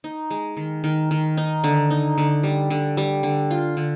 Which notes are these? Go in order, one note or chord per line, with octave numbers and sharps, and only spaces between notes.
D#4
G#3
D#3
D#3
D#3
D#4
D3
D#4
D3
G3
D3
G3
D3
F4
D3